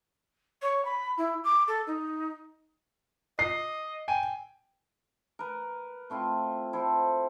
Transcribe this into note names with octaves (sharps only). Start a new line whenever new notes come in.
C#5
B5
E4
D6
A4
D#4
D#5 C7
G5 G#5 D#7
A#4 B4
A3 C4 E4 F4
E4 A4 C5 G5